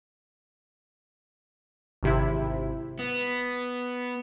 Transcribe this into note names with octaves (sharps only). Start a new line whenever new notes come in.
G#1 C3 E4
B3